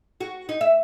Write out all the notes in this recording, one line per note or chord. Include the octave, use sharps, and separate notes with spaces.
F#4
D#4
E5